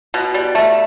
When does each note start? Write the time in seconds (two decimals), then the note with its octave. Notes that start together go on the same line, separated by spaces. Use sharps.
0.14 B2
0.34 G3
0.55 A3